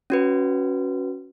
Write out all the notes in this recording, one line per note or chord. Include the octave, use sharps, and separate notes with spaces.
C#4 F#4 B4